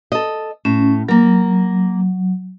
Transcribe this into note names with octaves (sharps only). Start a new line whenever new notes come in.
A4 D#5
A2 C#4
F#3 A#3 A#4